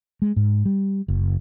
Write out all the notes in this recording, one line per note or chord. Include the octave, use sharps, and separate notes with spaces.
G#3
G#2
G3
F#1